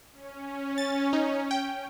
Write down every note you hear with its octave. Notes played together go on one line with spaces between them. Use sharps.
C#4
A6
D#4
G5